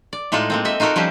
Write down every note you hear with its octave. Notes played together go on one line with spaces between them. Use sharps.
D5
A2 G#3 D#4 F4 A4
G#3 A#3 C4
A4 D#5 E5
D#4 F4 F#4 A4 A#4
F3 G3 C#4 G4 C5